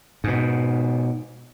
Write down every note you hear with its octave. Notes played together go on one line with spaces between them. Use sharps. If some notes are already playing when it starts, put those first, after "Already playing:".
G#2 B2